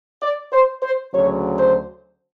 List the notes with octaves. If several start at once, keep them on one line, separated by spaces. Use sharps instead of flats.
D5
C5
C5
D2 C#3 F#3 C#5
C5